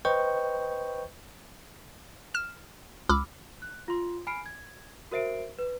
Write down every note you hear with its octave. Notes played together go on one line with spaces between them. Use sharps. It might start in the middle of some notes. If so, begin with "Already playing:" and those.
B4 C5 D#5 G5 C#6 G6
F6 E7
C#2 B5 D6 E6 F6
F#6
F4 C6
G#5 B5 F6 C7 D7
G#6
F#4 A#4 C5 E5 C7 D7
B4